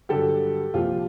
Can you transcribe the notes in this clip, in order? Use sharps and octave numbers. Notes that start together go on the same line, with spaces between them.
G2 D3 F#3 G4 A4
C2 A#2 F3 F4 G4